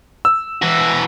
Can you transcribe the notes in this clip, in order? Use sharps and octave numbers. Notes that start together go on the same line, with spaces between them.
E6
E3 F#4